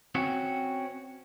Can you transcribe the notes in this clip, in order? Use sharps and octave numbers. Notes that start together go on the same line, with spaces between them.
C4 C#4 F#4